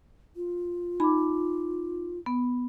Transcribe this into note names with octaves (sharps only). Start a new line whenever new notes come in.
F4
D#4 B5 D6
B3